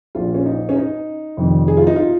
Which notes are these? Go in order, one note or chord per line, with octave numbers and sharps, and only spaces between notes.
A#1 A#2 F3 F4
C#4
D#4
C#4
D#4
F1 F2 D#3
G#4
F4
D#4
F4